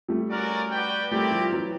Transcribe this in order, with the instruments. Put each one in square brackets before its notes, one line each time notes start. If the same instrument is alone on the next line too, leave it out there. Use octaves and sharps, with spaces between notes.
[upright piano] G3 A3
[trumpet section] C#4 F#4 A#4 D5
F#4 B4 D5 G5
[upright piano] G3 A3 [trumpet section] C4 E4 G4 A#4 D5
[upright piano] F3 G3
E3 F#3